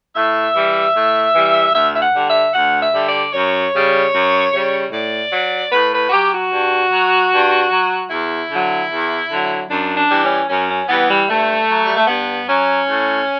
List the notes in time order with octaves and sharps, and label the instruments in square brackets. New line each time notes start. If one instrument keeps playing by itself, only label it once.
[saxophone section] A2 E5
E3 G3
A2
E3 G3
D2 E5
E5
F#5
D3 G3
E5
D2 F#5
E5
D3 G3
D5
F#2 C#5
C#3 G3
F#2
C#3 G3
A2 D5
F#3
A2 B4
B4
F#4
F#3 G4
F#4
G2
F#3
G2
F#3
E2 E4
D3 F#3
E2
D3 F#3
F#2 D4
D4
E3 G3
C#4
F#2 C#4
C#4
E3 G3 B3
G3
G2 A3
F#3
G3
A3
G2 B3
F#3 C#4
A2